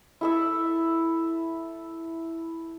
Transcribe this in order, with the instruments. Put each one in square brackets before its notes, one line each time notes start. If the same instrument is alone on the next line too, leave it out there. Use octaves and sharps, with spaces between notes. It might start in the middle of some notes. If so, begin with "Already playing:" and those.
[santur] E4 A4 E5